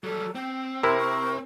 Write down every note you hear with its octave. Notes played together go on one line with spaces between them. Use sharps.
F#3 G3 A4
C4 G5
C3 E4 A#4 C6
C#6